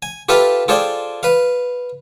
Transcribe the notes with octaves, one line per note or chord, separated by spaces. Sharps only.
G#5
F4 G4 A4 B4 E5 F5
F4 G#4 A4 C5 D5 G5
B4 F5